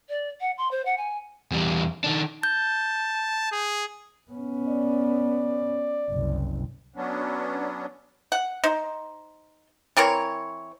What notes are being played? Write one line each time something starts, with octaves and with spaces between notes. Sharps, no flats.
D5
F#5
C6
C5
F#5
G#5
E2 G3
D#3 D4
A5 G6
G#4
B3 C#4
D5
F#1 C2
F#3 B3 C#4 D4
F#5
D#4 C5
E3 C4 A#4 C#5